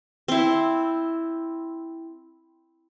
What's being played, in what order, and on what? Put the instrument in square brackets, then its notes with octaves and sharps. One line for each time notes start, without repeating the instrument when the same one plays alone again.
[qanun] C4 E4